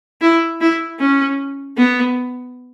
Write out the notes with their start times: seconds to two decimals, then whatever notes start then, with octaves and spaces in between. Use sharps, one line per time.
0.21 E4
0.61 E4
1.00 C#4
1.78 B3